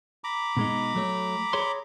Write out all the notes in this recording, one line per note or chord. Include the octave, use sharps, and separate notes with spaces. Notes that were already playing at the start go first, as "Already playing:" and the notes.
A#5 B5 D6
B2 G#3 D#4
F#3 A3 C#5
G#4 C#5 C6